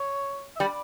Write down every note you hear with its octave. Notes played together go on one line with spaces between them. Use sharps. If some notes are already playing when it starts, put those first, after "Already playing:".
Already playing: C#5
E5
G3 D5